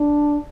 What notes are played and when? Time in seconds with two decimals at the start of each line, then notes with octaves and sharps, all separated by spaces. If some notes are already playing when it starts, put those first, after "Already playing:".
Already playing: D4